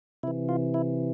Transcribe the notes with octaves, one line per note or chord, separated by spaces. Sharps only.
C3 E3 E4
F4
E4